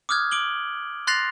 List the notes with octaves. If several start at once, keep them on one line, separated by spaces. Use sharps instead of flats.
D6 D#6 F6 F#6 G#6
D6 D7 F#7 G7
C6 F#6 A6 A#6 C7 F7